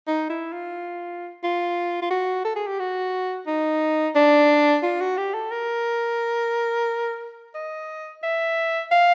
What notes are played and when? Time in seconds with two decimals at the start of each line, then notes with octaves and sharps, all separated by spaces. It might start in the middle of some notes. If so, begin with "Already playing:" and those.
0.07 D#4
0.30 E4
0.53 F4
1.43 F4
2.02 F4
2.11 F#4
2.45 A4
2.56 G#4
2.67 G4
2.80 F#4
3.47 D#4
4.16 D4
4.83 F4
5.01 F#4
5.18 G4
5.34 A4
5.52 A#4
7.55 D#5
8.23 E5
8.92 F5